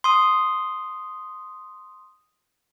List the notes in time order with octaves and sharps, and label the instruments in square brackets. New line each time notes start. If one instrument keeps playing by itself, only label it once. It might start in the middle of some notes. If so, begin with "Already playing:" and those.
[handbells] C6 D#6